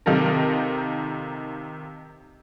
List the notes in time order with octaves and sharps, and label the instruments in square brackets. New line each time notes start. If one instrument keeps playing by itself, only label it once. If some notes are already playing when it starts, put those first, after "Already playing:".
[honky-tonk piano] C3 D#3 D#4 F4 A4 A#4